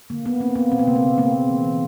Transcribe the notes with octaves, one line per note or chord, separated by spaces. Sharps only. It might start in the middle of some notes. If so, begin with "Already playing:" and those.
D3 A#3
A#3 B3
A#3 C4
A#3 B3
B2 C4
B3
C#3 A#3
B3
C#3
C#3 A#3 C4
A#3
E3
E3